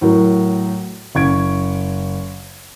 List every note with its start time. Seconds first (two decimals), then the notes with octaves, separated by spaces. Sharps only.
0.01 A2 F#3 A#4
1.15 F#1 C#6 G#6 D7